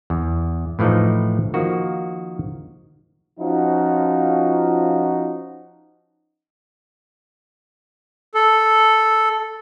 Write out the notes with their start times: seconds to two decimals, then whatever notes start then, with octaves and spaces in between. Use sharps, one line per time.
0.10 E2
0.79 A2 E3 F3 A3 D#4
1.54 D#3 F3 A#3 F#4
3.40 F3 C#4 D#4 F4 F#4
8.35 A4